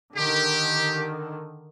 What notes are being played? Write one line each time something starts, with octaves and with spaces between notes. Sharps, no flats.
D3 D#3 G4